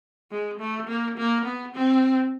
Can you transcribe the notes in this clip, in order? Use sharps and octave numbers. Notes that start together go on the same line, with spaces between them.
G#3
A3
A#3
A#3
B3
C4